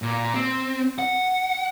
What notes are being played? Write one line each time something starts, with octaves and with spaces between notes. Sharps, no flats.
A#2
C4
F#5